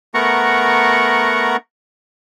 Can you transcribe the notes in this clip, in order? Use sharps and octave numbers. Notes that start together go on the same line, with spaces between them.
A3 B3 A#4 F#5 A#5 C#6